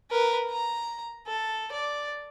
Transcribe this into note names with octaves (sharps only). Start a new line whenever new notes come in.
A#4 B4
A#5
A4
D5